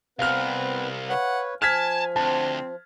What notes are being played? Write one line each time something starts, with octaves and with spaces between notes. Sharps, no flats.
C2 B3 C4 B4 F5 F6
B4 C#5 F#5
F3 G#5 A5 F6 G#6 B6
D2 C4 A5